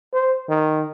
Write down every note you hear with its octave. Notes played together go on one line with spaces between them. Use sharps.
C5
D#3